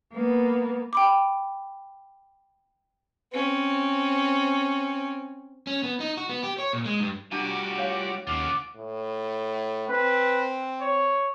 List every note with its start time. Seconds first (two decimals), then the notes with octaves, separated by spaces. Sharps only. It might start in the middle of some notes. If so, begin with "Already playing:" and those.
0.13 A#3 B3
0.93 G5 B5 D6
3.33 C4 C#4
5.67 C#4
5.83 B3
6.00 D#4
6.17 F#4
6.29 B3
6.43 G4
6.59 C#5
6.73 A#2
6.86 G#3
7.00 G2
7.32 G3 D4 F4 F#4 G#5 A#5 D6
7.78 C#5 F5
8.27 D#2 C#3 F4 F#5 D6
8.76 A2
9.89 C4 B4
10.81 C#5